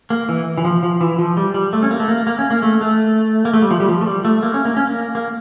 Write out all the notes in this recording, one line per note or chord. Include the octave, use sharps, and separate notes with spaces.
A#3
E3
E3
F3
F3
E3
F3
G3
G3
A3
C#4
A#3
A3
A#3
A#3
C#4
A#3
A3
A3
A#3
A3
G3
F3
G3
F3
A3
G3
A3
A#3
C#4
A#3
C#4
A#3
A#3